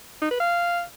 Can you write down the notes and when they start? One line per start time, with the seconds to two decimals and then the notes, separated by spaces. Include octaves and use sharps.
0.21 D#4
0.31 B4
0.40 F5